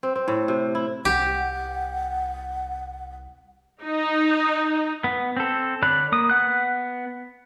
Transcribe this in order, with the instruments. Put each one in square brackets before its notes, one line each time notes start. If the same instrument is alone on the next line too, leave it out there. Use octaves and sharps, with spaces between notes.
[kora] C4
C4
A2
C3
E4
[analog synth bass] C2 [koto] G4 [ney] F#5
[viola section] D#4
[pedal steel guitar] B3
C4 A4
D3 C#5 D5 B5 F#6
A#3 D#6
B3 F#5 F#6